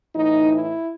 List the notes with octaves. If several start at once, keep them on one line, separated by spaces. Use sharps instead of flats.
A2 E3 D#4
E4